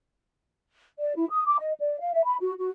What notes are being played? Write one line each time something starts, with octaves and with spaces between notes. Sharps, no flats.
D5
E4
D#6
D6
D#5
D5
F5
E5
B5
F#4
F#4